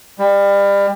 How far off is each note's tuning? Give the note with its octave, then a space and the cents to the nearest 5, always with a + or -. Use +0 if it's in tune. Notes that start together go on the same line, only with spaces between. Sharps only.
G3 +30